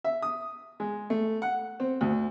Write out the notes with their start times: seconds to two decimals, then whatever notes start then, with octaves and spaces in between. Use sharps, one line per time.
0.04 E5
0.22 D#6
0.80 G#3
1.10 A3
1.42 F#5
1.80 C4
2.01 D2